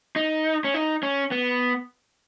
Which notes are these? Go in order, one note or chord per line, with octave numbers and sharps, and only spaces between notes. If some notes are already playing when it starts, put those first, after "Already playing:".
D#4
C#4
D#4
C#4
B3